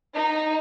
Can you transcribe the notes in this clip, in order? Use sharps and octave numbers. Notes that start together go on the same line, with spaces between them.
D#4